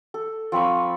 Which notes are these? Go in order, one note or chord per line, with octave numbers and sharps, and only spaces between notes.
A4
F3 C4 B5 C#6